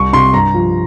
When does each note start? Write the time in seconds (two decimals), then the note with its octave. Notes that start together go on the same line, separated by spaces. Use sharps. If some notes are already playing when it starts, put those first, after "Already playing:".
Already playing: C2 C#6
0.13 C3 C6
0.33 G2 A#5
0.54 F3